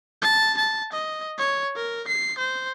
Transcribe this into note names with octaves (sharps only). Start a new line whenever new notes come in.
A5
A5
D#5
C#5
A#4
C7
C5